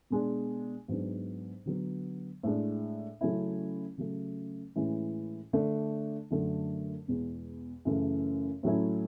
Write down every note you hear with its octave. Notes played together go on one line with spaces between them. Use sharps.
B2 G#3 D4
G#2 F#3 B3 D4
D3 F#3 B3
A2 G#3 D4
C#3 F#3 A3 C#4 E4
C#3 F#3 A3
A2 E3 G#3 C#4 E4
D3 A3 D4
F#2 D3 F#3 A3
E2 B2 G#3
F#2 C#3 E3 A3 C#4
A2 F#3 A3 C#4 E4